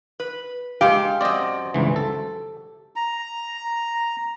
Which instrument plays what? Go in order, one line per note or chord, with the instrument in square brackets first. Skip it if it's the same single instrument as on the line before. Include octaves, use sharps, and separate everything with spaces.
[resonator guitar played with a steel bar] B4
[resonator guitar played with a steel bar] G#3 F5 [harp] G4
[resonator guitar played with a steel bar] F#2 C4 [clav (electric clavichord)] D5 D#5
[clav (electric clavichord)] G1 C#2 E3
A4
[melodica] A#5